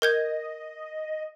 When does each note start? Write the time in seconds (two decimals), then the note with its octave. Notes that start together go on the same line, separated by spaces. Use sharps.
0.02 A#4 D#5 G6 G#6